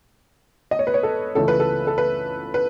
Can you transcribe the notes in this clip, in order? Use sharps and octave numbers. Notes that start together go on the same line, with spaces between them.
D#5
C#5
B4
C#5
A4
C#2 C#3 E3 A3 C#4 A4
B4
A4
A4
B4
B4